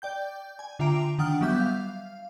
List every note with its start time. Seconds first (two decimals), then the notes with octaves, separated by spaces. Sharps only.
0.02 D5 G5 G6
0.59 G#5
0.79 D3 F4 E5 G5 A#5 D7
1.18 D#3 D4 F#5 G5 D#6 F6
1.41 F#3 G3 B3 E5 D6 G6
1.60 F5